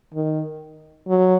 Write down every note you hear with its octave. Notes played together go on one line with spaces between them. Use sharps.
D#3
F#3